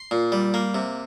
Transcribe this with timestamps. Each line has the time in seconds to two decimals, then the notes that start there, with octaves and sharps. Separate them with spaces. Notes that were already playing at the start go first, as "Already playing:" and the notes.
Already playing: C6
0.11 A#2
0.32 G3
0.54 A#3
0.75 C3